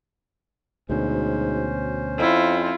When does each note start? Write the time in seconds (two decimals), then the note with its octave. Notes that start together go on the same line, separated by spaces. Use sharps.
0.89 D2 G#2 B2 C#4 C5
2.19 F2 E4 F4